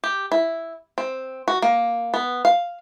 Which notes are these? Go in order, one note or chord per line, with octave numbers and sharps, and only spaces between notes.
G4
E4
C4
F#4
A#3
B3
F5